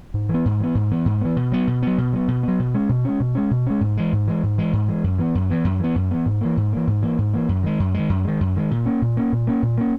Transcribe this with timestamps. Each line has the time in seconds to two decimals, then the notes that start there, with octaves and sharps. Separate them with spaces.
0.14 G#2
0.29 E3 B3
0.45 G#2
0.60 E3 B3
0.75 G#2
0.91 E3 B3
1.06 G#2
1.21 E3 B3
1.36 B2
1.52 F#3 B3
1.67 B2
1.83 F#3 B3
1.98 B2
2.13 F#3 B3
2.28 B2
2.43 F#3 B3
2.59 B2
2.74 G#3 C#4
2.89 B2
3.05 G#3 C#4
3.20 B2
3.35 G#3 C#4
3.51 B2
3.66 G#3 C#4
3.81 G#2
3.97 E3 G#3
4.13 G#2
4.27 E3 G#3
4.43 G#2
4.58 E3 G#3
4.73 G#2
4.88 E3 G#3
5.04 F#2
5.18 E3 B3
5.35 F#2
5.50 E3 B3
5.65 F#2
5.80 E3 B3
5.95 F#2
6.11 E3 B3
6.26 G#2
6.41 E3 A#3
6.57 G#2
6.73 E3 A#3
6.87 G#2
7.02 E3 A#3
7.18 G#2
7.34 E3 A#3
7.49 F#2
7.63 D#3 G#3
7.80 F#2
7.94 D#3 G#3
8.09 F#2
8.25 D#3 G#3
8.41 F#2
8.56 D#3 G#3
8.71 A#2
8.86 A#3 C#4
9.02 A#2
9.17 A#3 C#4
9.32 A#2
9.47 A#3 C#4
9.62 A#2
9.78 A#3 C#4